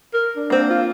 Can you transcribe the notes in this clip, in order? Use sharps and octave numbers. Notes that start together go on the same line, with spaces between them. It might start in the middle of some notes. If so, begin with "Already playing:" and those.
A#4
D4
A#3 C4
F4